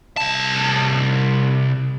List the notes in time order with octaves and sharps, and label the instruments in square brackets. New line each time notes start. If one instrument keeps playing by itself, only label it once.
[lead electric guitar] C2 A5